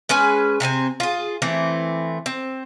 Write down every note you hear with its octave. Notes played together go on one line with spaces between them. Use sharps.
G#3 C#4 B4 G#5
C3 C4 D#4 G#5
F4 G#4
E3 A3 C4
C4